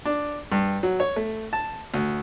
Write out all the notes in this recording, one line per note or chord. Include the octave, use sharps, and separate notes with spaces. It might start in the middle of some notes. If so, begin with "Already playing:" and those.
D4
G2
F#3
C#5
A3
A5
D2